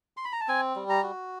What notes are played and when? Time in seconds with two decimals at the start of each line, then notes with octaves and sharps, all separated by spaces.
0.17 C6
0.25 B5
0.33 A#5
0.41 A5
0.48 C4 G#5
0.76 G3
0.90 A#5
1.03 F#4